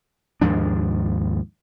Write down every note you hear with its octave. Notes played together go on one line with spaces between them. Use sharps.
D#2 G#2 F3 D4